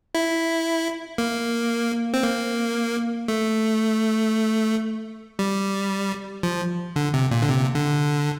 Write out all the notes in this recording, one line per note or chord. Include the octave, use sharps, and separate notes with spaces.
E4
A#3
C4
A#3
A3
G3
F3
D3
C3
A#2
D3
C3
D3